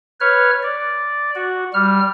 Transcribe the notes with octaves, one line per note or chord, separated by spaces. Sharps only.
B4 C#5 F6
D5
F#4
G3 F6